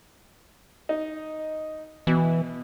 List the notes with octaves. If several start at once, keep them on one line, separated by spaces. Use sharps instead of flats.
D#4
B2 E3